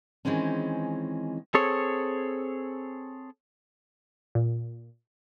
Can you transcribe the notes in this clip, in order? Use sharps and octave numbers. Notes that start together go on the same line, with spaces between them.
D#3 E3 G#3 C4 C#4
C4 G#4 A4 C#5
A#2